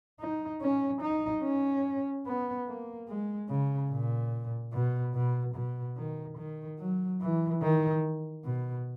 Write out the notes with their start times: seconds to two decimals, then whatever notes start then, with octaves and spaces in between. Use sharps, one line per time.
0.20 D#4
0.61 C#4
1.02 D#4
1.43 C#4
2.26 B3
2.67 A#3
3.08 G#3
3.49 C#3
3.91 A#2
4.73 B2
5.14 B2
5.55 B2
5.97 D#3
6.38 D#3
6.79 F#3
7.21 E3
7.62 D#3
8.44 B2